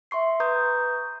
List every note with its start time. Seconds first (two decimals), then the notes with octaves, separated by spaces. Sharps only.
0.11 E5 C6 C#6 C7
0.40 B4 A#5 C#6 D#6 G6 G#6